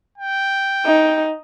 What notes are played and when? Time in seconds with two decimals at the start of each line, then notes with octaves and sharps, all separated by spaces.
0.18 G5
0.86 D#4